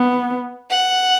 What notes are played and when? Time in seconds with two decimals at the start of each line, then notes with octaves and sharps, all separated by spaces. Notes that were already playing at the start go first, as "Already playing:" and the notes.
Already playing: B3
0.70 F#5